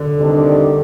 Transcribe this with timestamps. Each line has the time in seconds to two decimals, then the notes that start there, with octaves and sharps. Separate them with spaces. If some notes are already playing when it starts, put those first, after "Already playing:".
Already playing: D3
0.19 C3 D#3 G3 D4